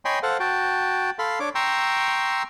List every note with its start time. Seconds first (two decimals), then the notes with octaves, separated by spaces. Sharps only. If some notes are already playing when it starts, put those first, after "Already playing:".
0.05 C#5 D#5 G5 G#5 B5 C6
0.23 A4 C5 F5 F#5
0.40 F#4 G5 A5
1.19 A4 F5 B5 C6
1.40 D4 C#5 D6
1.55 G5 A#5 C6 C#6 E6